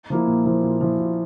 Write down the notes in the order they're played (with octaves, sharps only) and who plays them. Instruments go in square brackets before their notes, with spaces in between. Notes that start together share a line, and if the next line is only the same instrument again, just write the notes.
[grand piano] F3 A#3 E4
A#2
F3 A#3 E4
A#2
F3 A#3 E4
A#2